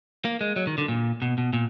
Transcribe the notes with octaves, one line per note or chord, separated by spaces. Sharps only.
A#3
G#3
F#3
D#3
D3
A#2
B2
B2
A#2